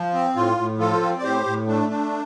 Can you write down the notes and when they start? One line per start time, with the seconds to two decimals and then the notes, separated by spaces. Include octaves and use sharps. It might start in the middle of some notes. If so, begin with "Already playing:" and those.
Already playing: F3
0.14 C4
0.36 A2 F4
0.58 A2
0.79 F3 F4 A4
1.02 C4
1.18 D5
1.23 A2 G4 C5
1.46 A2
1.67 A3 D4
1.90 D4